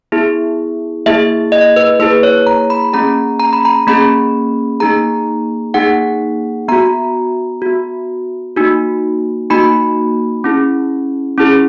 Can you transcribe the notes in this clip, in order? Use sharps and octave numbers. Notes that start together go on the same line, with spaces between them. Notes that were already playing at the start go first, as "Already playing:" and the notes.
B3 E4 G#4
A#3 E4 G#4 E5
D#5
B4
A#3 E4 G#4 B4
C#5
A#5
B5
A#3 C#4 G#4 A#5
A#5
B5
A#5
A#3 C#4 G#4 B5
A#3 D#4 G#4 A#5
A#3 D#4 G#4 F#5
B3 F#4 A#5
B3 F#4
A#3 D#4 F#4
A#3 D#4 F#4 B5
C#4 E4 G#4
C#4 E4 G#4